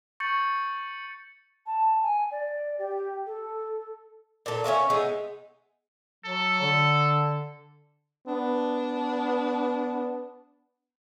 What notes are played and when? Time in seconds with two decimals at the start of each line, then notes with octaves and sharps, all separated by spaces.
0.20 C#6 G6 A6 C#7 F#7
1.66 A5
2.03 G#5
2.31 D5
2.78 G4
3.26 A4
4.46 A#2 A4
4.64 C#4 C#5 E5 F5
4.90 G#3 B3 D#4 E4
6.25 F#3 A4
6.61 D3
8.27 B3 D4